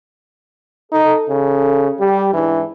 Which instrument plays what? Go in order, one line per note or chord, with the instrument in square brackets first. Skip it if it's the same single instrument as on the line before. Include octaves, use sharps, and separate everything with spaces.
[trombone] D#4 [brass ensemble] A4
[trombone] C#3
[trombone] G3 [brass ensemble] G4
[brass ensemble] G#2 D4 E4 [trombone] E3